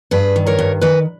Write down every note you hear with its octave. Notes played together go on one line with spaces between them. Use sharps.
G2 G#4 B4
D#3
A#4 C#5
G2
D#3 B4 D#5